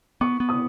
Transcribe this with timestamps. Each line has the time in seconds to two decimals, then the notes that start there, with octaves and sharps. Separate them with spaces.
0.21 B3 C#6
0.40 B3
0.49 D#6